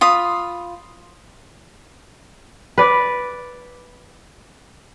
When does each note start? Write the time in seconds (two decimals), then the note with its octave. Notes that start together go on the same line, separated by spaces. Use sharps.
0.01 F4 B5 D#6
2.78 B4 D5